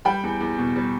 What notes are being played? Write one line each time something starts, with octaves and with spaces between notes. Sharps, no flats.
G3 G5 B5
E2
E2
B2
G3